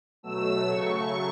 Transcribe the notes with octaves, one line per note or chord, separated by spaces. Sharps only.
B2 F#3 A3 E6
C#3 F#3 A3 C#6